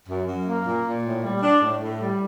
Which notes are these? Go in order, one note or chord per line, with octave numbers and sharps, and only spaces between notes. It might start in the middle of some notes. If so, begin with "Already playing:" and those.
F#2
F#2
A#3
A#2
A#2
A2
G3
D4
A2
A2
G3